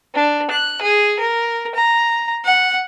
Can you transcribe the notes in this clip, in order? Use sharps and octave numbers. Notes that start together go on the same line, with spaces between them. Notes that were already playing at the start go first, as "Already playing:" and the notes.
D4
F#6
G#4
A#4
A#5
F#5